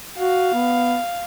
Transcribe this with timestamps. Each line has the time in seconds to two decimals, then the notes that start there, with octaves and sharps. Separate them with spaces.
0.18 F#4 F5
0.54 B3